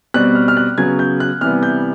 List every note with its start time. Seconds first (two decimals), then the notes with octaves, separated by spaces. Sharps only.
0.14 B2 G3 C4 F#6
0.35 F6
0.48 F6
0.57 F#6
0.78 C#3 F#3 B3 G#6
0.99 G6
1.20 F#6
1.41 C3 E3 G3 B3 F6
1.63 G6